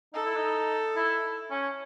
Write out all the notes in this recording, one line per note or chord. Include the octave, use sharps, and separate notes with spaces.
D#4 A4
E4
D#4
E4
C#4